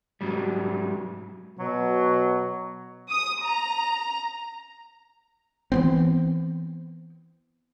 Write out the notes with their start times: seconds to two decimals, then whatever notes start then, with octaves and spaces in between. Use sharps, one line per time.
0.21 G#2 F#3 G3
1.59 B2 F#3
3.10 D#6
3.43 A#5
5.72 E3 B3 C4